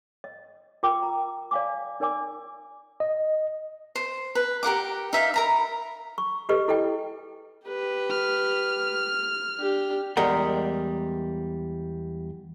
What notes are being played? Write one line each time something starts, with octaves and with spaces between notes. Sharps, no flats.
D#5
F4 A#4 G5 D6
A#5
D5 F5 G#5 D6
D#4 A#4 D5 G#5 D6
D#5
C5
B4
G4 A#4 F#5 D6
D#4 E5 F5
A#4 A#5 B5
C#6
G4 A4 B4 D#5 C#6
E4 A4 D#5 G5
G4 B4
F6
D4 G4
E2 G3 G#3 A#4 F#5 G5